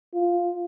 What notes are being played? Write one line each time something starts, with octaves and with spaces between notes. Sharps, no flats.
F4